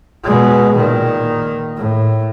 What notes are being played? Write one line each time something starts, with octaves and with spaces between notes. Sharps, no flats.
B2 G#3
A#2 D#3
A2